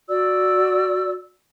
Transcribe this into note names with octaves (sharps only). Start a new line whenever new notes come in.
F#4 D5 E6